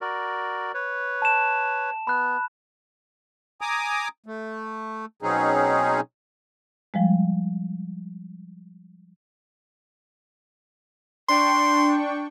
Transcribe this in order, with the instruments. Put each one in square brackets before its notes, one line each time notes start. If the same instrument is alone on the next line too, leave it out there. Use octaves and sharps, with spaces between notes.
[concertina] F#4 A#4 D5
B4 C#5
[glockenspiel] A5 E7
[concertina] B3 [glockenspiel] B5 F#6
[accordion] G#5 A#5 D6 D#6
A3
B2 F#3 C4 C#4 D#4 G#4
[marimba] F3 G3 G#3
[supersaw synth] D4 G5 C#6 [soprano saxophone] C6